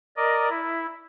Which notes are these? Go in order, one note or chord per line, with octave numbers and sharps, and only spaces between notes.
A#4 D5 D#5
E4